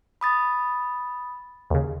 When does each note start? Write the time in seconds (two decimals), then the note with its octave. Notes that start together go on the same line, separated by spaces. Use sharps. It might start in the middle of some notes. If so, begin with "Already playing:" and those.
0.21 B5 D#6 A6
1.70 D#2 C#3